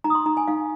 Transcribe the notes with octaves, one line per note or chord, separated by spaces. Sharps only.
D#4 A#5
D#6
C6
D#4 A#5
G#5
D#4 F5